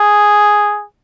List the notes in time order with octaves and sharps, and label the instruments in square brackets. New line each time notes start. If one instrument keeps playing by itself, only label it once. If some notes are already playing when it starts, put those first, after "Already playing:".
Already playing: [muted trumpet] G#4